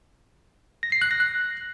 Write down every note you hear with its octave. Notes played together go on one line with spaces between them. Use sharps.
A#6
C7
F#6
A#6
F#6